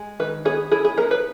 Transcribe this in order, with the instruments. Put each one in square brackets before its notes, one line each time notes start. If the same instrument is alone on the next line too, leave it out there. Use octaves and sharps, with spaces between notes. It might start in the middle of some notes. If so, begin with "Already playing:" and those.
Already playing: [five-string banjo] G#3
D#3 B4
B3 G#4
E4 G#4
G#4
B3 A#4
B4